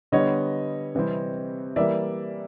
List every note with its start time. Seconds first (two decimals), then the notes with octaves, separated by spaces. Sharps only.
0.12 D3 G3 B3 C#5 D#5
0.95 C3 E3 G3 C4
1.76 E3 G3 A#3 D5 E5